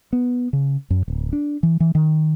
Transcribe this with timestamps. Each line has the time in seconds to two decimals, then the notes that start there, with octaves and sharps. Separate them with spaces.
0.13 B3
0.53 C#3
0.90 F#2
1.08 D1
1.33 D4
1.63 E3
1.80 E3
1.95 D#3